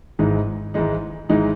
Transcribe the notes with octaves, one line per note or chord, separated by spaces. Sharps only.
G#1 G#2 E3 G#3 D#4
G#1 G#2 E3 G#3 D#4
G#1 G#2 E3 G#3 D#4